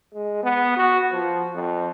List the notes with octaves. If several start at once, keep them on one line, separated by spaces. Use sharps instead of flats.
G#3
B3
F#4
F3
F2